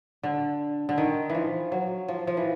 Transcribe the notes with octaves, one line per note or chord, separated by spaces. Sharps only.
D3
D3
D#3
E3
F3
F#3
F3
F3
E3